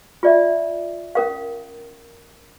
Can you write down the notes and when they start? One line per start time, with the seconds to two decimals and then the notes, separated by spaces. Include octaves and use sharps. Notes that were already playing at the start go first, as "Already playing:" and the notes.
0.23 F4 D5 E5
1.15 C#4 A#4 F5